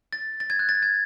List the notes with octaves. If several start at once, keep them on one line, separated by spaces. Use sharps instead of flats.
A6
A6
G#6
F#6
A6
G#6